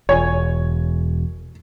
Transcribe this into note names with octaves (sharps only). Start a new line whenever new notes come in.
E1 C#5 G#5